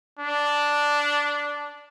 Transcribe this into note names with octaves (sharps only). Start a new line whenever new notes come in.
D4